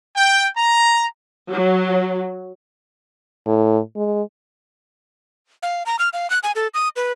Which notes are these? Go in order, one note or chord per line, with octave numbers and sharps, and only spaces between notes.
G5
A#5
F#3
A2
G#3
F5
A#5
F6
F5
F#6
G#5
A4
D#6
B4